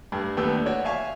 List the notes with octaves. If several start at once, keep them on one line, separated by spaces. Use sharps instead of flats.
G2 A3
D#2 A3 B3 D4 E6
F#4 C#5 D5
E5 F5 G#5 C#6